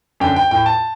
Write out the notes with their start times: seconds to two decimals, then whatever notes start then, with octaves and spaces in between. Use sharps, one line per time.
0.20 F#2 D3 G5
0.36 G5
0.51 A2 G5
0.66 A5